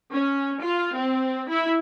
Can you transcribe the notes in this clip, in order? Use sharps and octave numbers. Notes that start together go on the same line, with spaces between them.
C#4
F4
C4
E4